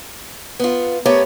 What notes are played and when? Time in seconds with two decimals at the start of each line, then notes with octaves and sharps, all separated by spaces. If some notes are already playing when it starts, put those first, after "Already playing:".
0.60 B3 F4
1.06 A3 B3 G4 A#4 C#5 D5